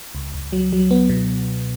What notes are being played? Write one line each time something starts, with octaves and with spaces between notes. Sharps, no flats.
C#2
C#2
F#3
F#3
B3
B2